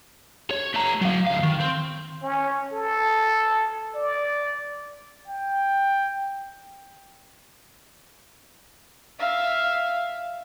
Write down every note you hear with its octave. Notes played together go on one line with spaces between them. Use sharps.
C#5
A3 A#5
F#3 F5
D2 F5
D#3
C4
C#4
A4
D5
G5
E5 F5